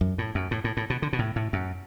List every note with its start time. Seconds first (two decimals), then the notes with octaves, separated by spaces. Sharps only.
0.01 F#2
0.18 A2
0.35 F#2
0.51 A2
0.64 A2
0.77 A2
0.90 B2
1.02 D3
1.13 B2
1.19 A2
1.36 A2
1.53 F#2